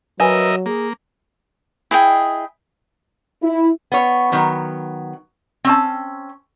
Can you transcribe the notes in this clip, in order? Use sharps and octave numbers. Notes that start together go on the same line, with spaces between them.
F#3 A#4 B4 D#5 E5 G#5
A#3 G#4
E4 G#4 D#5 G5
E4
B3 C#5
D#3 F#3 B3
C4 C#4 A5